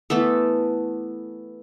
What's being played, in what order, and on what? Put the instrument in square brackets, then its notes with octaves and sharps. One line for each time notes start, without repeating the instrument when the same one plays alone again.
[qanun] E3 A3 B3 A4